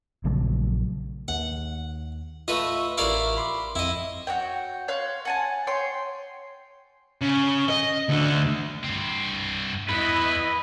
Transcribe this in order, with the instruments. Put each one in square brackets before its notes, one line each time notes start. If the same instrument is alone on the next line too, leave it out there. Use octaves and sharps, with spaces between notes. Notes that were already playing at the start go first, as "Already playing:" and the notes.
[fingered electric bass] A#1 C#3 F#3 A3
[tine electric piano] D#2 [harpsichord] F#5
[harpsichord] A3 B4 D#5 [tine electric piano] F4 C#6 E6
[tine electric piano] A1 A#4 C#6 [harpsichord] E4 D5 F5
[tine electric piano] B5 C6 D6
[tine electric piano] F2 [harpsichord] E4 D#5
[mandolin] F#4 C#5 G5
C#5 F5 C6 F#6
F#5 G#5 A5
C#5 G5 C6
[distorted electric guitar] C#3
D#5
D2 D3
G2 C4
[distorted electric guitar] E2 [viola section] E4 D#5 [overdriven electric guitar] B4